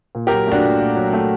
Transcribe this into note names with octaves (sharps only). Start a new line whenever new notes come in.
A#2
G4 A#4
F#3
A3 D4 F#4
A#2
A#2
F#3
A3